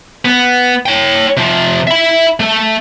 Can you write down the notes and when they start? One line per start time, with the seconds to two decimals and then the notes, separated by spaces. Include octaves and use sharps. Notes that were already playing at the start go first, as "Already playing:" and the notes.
0.25 B3
0.86 C#5 G5
1.37 C3 F3
1.87 E5 B5
2.40 A3 A4